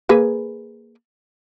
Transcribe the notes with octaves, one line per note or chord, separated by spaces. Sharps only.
A#3 G#4 B4